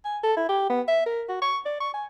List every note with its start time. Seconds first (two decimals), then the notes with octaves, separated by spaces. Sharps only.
0.05 G#5
0.24 A4
0.37 E4
0.49 G4
0.70 B3
0.88 E5
1.06 A#4
1.29 F#4
1.42 C#6
1.66 D5
1.81 C#6
1.94 G#5